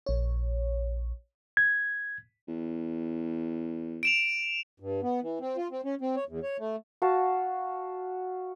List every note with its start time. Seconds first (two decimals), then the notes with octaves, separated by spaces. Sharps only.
0.06 A#1 C#5
1.57 G#6
2.48 E2
4.03 D7 E7 F7
4.80 G2
5.03 B3
5.22 E3
5.40 C4
5.57 F4
5.71 C4
5.85 C#4
6.01 C4
6.16 C#5
6.29 E2
6.43 C#5
6.59 A3
7.02 F#4 F5 A5